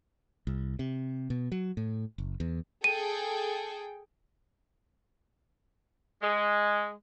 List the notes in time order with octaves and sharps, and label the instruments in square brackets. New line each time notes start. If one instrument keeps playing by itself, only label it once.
[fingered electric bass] C2
C3
B2
F#3
A2
F#1
E2
[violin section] G#4 A4 G5 [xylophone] D#7
[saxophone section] G#3